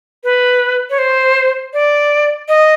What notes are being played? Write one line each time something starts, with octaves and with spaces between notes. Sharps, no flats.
B4
C#5
C5
D5
D#5